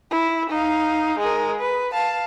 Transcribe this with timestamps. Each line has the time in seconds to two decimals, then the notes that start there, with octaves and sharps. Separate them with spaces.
0.11 E4
0.50 D#4 F5
1.19 G#3 A#4
1.60 B4
1.93 F5 A5